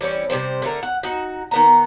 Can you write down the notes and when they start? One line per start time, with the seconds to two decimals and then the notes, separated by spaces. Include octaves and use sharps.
0.01 E3 G3 C4 C#4
0.30 C3 E3 G3 C5
0.62 D3 A3 A#4
0.83 F#5
1.03 D#4 F#4
1.51 D#3 B3 A#5